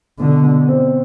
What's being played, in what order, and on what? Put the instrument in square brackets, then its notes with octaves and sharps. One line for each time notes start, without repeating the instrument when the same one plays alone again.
[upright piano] B2 [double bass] D3
[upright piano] B2
C4